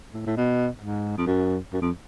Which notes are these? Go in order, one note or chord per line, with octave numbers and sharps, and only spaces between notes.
A2
A2
B2
G#2
F2
F#2
F#2
F2